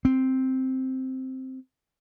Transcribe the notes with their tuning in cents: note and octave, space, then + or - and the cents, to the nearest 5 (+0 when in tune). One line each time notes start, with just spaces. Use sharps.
C4 +0